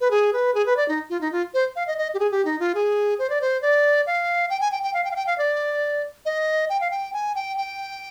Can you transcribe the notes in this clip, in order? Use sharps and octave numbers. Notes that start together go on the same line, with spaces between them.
B4
G#4
B4
G#4
B4
D5
D#4
F4
D#4
F4
C5
F5
D#5
D#5
G4
G#4
G4
D#4
F4
G#4
C5
D5
C5
D5
F5
G5
G#5
G5
G5
F5
G5
F5
G5
F5
D5
D#5
G5
F5
G5
G#5
G5
G5